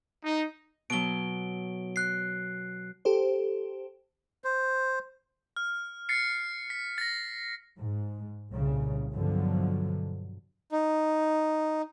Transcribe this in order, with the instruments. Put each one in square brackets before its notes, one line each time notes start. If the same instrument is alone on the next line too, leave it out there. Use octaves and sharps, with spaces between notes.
[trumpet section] D#4
[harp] B2 F#3 [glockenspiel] D7 G7
[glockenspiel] F#6 C7
[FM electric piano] G4 A4 C5
[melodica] C5
[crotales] F6
A6 C7 C#7
B6
A6 A#6
[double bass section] G#2
C2 A#2 C#3
G2 B2 D3 F3 F#3
[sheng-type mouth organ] D#4